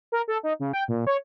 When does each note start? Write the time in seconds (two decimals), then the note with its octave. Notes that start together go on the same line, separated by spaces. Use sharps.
0.12 A#4
0.28 A4
0.43 D#4
0.60 C#3
0.73 G5
0.88 A#2
1.07 C#5